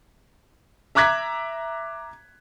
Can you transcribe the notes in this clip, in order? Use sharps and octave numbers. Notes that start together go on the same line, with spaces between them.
E5 A#5 D6 F#6 G#6 B6